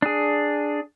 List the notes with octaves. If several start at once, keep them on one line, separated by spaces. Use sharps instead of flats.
D4 G#4